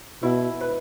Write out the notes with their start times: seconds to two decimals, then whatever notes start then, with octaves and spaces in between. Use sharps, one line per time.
0.22 B2 E4
0.61 B4